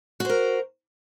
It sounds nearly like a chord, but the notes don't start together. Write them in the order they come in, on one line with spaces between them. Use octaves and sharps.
F#4 C5 A#4